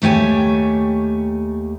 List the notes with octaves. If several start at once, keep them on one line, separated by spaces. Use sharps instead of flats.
D#2 A3 G4 C#5 G#5